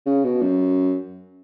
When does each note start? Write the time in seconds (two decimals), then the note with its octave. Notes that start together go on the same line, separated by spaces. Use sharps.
0.06 C#3
0.24 B2
0.42 F#2